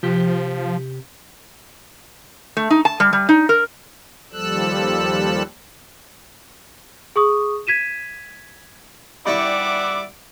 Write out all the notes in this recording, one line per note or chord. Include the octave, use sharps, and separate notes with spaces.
C3 F3 G4
A3
D#4
A5
G3
G3
D#4
A#4
D#2 F3 G3 A4 E6 F#6
G#4 C#6 D#6
G#6 B6 D#7 E7
G3 E4 D5 E5 F#5 C#6 D6